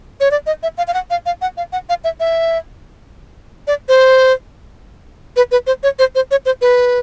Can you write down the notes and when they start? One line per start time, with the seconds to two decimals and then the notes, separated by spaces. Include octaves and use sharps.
0.20 C#5
0.31 D5
0.46 D#5
0.63 E5
0.78 F5
0.88 F5
0.94 F#5
1.10 F5
1.26 F5
1.41 F#5
1.57 F5
1.73 F#5
1.89 F5
2.04 E5
2.20 E5
3.67 D5
3.89 C5
5.36 B4
5.52 B4
5.67 C5
5.83 C#5
5.99 C5
6.15 C5
6.31 C#5
6.46 C5
6.61 B4